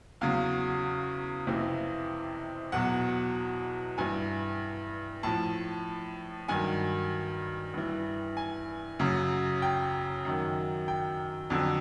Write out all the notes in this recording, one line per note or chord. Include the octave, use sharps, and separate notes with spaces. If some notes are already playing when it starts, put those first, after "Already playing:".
E2 C#3 F#3 F5
F2 C3 E3
E2 B2 F#3 F#5
G2 E3 G#5
A2 F3 A5
G2 D#3 F#3 G#5
G2 E3
G#5
F#2 C#3 F#3
G5
F#2 D#3 F#3
G5
F2 D3 F#3